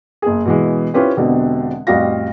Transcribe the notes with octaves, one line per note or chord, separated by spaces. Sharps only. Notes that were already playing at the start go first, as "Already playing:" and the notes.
F#1 G#4
B2 E3 G#3
C#4 E4 F4 G4 B4 C5
E1 B2 D3 C4 G4
A1 F2 G3 F#4 F5 A#6